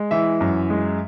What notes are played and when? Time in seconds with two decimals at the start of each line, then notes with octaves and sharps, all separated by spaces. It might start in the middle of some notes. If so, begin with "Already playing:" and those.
Already playing: G#3
0.11 E3 E5
0.41 F#2
0.70 G#3